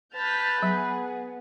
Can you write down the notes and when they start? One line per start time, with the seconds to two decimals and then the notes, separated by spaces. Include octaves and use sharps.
0.14 B4 A5 F6 G6 B6
0.63 F#3 B3 G#4